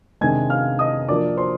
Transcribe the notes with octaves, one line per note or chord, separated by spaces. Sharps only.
C3 D#3 G#3 D4 G#5 G#6
F5 F6
D#5 D#6
F3 A#3 D4 D5 D6
C5 C6